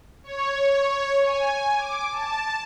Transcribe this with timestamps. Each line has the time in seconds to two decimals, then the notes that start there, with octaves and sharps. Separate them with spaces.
0.24 C#5
1.25 G#5
1.77 D6
2.12 A5